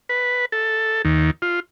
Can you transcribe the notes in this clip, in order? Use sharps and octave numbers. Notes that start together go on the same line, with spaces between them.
B4
A4
D#2
F4